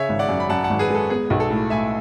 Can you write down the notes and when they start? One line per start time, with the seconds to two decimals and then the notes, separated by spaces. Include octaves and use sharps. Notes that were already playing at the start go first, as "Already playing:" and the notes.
Already playing: C#3 C#5 E5
0.09 G#1
0.19 D5 F#5
0.29 F#2
0.40 B5
0.49 F#2 F#5 A5
0.64 F#5 A5
0.70 G#1
0.79 G#4 B4
0.90 G#3 A4
1.10 B3 G#4
1.30 B1
1.40 A4
1.50 A2
1.70 A2 E5 G#5